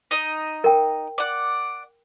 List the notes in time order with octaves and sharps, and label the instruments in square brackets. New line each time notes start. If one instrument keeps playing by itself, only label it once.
[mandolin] D#4 D#5
[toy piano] A#4 G5
[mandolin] D5 F#5